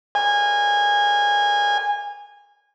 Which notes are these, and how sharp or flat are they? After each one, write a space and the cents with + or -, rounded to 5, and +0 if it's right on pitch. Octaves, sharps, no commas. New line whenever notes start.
G#5 -20